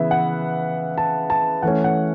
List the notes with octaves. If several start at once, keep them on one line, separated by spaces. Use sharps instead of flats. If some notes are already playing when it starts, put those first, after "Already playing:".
Already playing: C#3 E3 B3 B4 E5
F#5
A5
A5
E3 A3 C#4 F#5
F#5